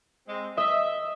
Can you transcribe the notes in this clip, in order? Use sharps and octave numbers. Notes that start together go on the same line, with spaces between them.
G#3 C4
D#5 E5